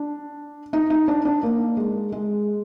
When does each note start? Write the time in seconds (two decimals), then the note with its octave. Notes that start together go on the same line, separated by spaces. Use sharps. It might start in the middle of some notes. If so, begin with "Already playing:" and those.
Already playing: D4
0.73 D#4
0.90 D#4
1.08 D4
1.25 D4
1.43 A#3
1.77 G#3
2.12 G#3